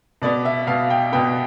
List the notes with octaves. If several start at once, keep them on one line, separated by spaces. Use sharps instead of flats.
B2 B3 D5
E5
B2 B3 F5
G5
B2 B3 G5